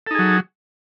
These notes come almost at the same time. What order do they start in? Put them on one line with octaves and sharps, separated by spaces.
A4 D#4 G#4 F#3